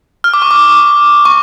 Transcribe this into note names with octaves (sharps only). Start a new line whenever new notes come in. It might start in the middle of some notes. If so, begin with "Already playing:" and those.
F6
D6
C#6
D6
C#6